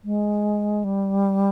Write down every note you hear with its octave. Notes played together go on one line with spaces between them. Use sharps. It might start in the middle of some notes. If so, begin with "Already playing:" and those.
G#3
G3